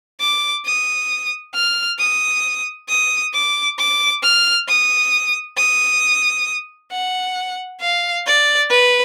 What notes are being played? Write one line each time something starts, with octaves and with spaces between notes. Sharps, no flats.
D6
D#6
F6
D#6
D#6
D6
D6
F6
D#6
D#6
F#5
F5
D5
B4